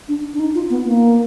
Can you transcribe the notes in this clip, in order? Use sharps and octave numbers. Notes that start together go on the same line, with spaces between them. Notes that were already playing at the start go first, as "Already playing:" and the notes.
D4
D4
D#4
F4
B3
A#3